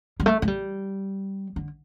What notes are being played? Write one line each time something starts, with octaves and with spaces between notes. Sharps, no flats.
G3
A3
A3
G3
D3